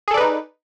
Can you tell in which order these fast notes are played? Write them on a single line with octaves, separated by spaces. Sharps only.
G#4 A4 D5 B4 D#4